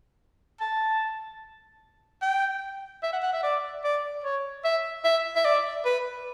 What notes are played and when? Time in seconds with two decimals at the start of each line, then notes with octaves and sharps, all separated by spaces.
0.61 A5
2.22 G5
3.03 E5
3.13 F#5
3.23 F#5
3.33 E5
3.43 D5
3.84 D5
4.24 C#5
4.65 E5
5.05 E5
5.36 E5
5.45 D5
5.85 B4